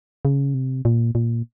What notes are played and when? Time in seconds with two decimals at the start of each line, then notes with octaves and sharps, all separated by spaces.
0.25 C#3
0.54 C3
0.85 A#2
1.15 A#2